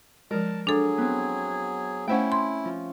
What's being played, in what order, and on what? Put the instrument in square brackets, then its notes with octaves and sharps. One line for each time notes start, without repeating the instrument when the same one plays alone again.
[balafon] F3 G#3 [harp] A#4 [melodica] A5
[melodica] F#3 G#4 [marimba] D4 A4
[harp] B3 C4
[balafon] A3 C5 F#5 [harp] C#4 E5 G5 [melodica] E4
[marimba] C6
[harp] F3